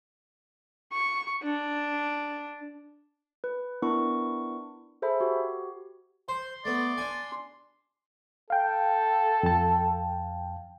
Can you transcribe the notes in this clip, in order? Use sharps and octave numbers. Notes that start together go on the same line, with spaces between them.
C#6
D4
B4
B3 D4 E4 A#4 C#6
G#4 A4 C5 E5 B5
F#4 G4
C5 C6
A3 B3 D5
D4 G#5
A4 F5 G5
F2 A5